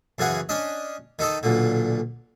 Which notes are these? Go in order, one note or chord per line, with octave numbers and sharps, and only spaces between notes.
F#2 C#3 E3 G#4 F#5
C#4 D4 D#5
D#3 D#4 A4 D#5
B1 A#2 D3